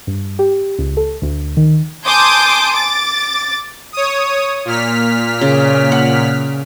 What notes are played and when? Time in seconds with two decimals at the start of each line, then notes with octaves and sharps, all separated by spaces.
0.07 G2
0.39 G4
0.79 C#2
0.97 A4
1.22 D2
1.57 D#3
2.05 G#5 A5 C6 D6 D#6 G6
2.74 D6 A6
3.93 C#5 D#6
4.65 A#2 F6 B6
5.41 C#3
5.92 F#5